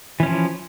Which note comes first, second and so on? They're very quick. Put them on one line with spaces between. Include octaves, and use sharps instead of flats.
E3 C#4 F3